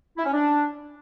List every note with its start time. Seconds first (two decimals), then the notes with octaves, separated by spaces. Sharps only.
0.18 E4
0.25 C#4
0.33 D4